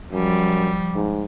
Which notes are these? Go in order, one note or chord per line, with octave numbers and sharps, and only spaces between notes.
F#2 F3 G3
G#2